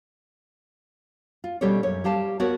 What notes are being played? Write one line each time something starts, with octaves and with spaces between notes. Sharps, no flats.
F4
B2 G3 C#4 G4 A4 C#5
F#2 C#5
G3 G4 F5 A5
B3 F#4 A#4 C#5 F#5